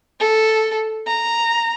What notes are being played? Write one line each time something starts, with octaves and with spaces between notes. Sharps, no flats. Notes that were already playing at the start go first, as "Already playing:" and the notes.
A4
A#5